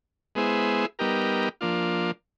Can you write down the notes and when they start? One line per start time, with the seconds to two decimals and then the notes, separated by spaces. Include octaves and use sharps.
0.35 G#3 B3 E4 G#4 C5
0.99 G3 B3 D#4 G4 A#4
1.61 F3 A#3 D4 F4